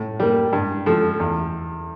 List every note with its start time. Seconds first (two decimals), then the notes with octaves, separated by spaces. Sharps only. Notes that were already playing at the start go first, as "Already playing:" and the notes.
Already playing: A2
0.20 G3 A#3
0.53 G2
0.86 F3 A3
1.20 E2